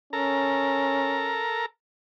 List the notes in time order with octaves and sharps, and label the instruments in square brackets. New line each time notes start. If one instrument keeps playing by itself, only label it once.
[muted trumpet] C#4 [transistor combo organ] A4 A#4 A#5